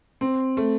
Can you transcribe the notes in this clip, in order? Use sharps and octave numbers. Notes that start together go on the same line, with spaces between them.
C4
A3